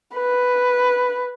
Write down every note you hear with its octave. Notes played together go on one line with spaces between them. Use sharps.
B4